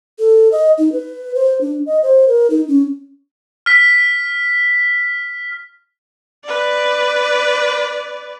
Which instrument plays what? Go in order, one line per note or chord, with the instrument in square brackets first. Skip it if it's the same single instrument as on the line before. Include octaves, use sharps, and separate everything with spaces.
[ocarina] A4
D#5
D#4
B4
C5
D4
D#5
C5
A#4
D#4
C#4
[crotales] F6 B6
[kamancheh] B4 D5